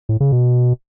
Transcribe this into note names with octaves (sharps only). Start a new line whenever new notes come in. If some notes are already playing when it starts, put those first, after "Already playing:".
A2
C#3
B2